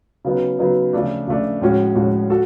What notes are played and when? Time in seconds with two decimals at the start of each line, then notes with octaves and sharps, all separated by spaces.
0.25 C#3 F#3 B3 D#4
0.59 C#3 F#3 B3 D#4
0.93 C#3 F3 A3 D4
1.28 C#3 F3 A3 D4
1.61 A2 F3 G#3 C#4 F#4
1.95 A2 F3 G#3 C#4 F#4
2.30 F#4 A4